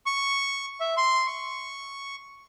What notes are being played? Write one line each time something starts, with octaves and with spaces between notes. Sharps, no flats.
C#6
E5
C6
C#6